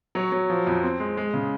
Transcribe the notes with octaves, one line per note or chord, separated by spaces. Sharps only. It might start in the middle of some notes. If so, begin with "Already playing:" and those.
F#3 C#5
F#3
F3
F2
C4
G#3
G#3
C#3